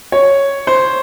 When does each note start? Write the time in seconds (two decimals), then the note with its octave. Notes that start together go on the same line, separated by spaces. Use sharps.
0.12 C#5
0.67 C5